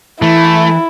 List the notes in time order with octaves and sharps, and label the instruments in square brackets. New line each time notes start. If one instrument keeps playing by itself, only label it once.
[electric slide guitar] E3 [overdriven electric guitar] A3 [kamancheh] E4